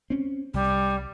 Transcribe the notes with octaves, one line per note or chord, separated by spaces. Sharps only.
C4 C#4
C2 G3